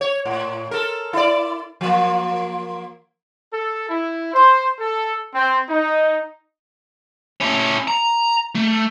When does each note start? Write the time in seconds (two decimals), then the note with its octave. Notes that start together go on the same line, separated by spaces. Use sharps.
0.01 C#5
0.25 A2
0.71 A4 A#4
1.13 E4 D5
1.81 F3 A#3
3.54 A4
3.90 E4
4.34 C5
4.80 A4
5.35 C4
5.69 D#4
7.40 C#4 E4
7.88 A#5
8.55 A3